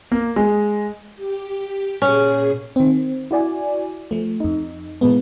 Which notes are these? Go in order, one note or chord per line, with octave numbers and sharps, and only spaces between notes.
A#3
G#3
G4
A#2 C#4 G#4
D#3 C4
E4 F#4 D5 G#5
F3 A3
F2 D#4
A#2 E3 G#3 B3